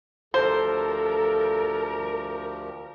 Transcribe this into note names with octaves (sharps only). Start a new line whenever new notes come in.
D2 F3 G4 A4 A#4 C5